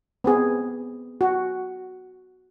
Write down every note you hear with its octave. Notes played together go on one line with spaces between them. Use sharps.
B3 C4 G#4
F#4